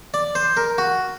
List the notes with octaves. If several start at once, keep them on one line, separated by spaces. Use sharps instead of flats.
D5
C5
A#4
F#4